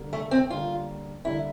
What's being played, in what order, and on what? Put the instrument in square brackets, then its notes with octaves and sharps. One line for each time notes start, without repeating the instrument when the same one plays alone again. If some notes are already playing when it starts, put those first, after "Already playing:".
Already playing: [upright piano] D3 G3 A#3
[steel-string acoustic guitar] A3
C4
[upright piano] D3 G3 A#3 [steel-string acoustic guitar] F4
[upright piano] D3 G3 A#3 [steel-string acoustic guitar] E4